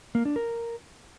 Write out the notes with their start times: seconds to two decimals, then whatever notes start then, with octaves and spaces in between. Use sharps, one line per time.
0.15 A#3
0.25 D4
0.36 A#4